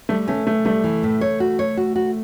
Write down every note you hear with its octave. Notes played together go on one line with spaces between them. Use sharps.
G3 A3
A3 C#4
A3 C#4
G3 A3
E3
A2
C#5
F#4
C#5
F#4
F#4